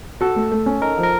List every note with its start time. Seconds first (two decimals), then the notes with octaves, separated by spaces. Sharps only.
0.21 F#4 A4
0.36 A3
0.52 A3
0.66 C#4
0.82 D#4 A#4
0.98 F3
1.03 A#4